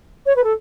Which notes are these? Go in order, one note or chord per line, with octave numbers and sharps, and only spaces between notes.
C#5
B4
A4